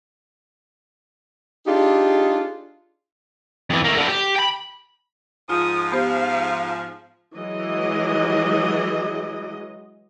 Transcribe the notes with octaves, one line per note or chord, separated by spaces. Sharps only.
D4 D#4 F4 G4 G#4
F2 E3
A3 A#3
D3 E4
G4
G5 B5
G#2 F3 F4 D#6
B3 G4 C5 F5
E3 F#3 G#3 D#5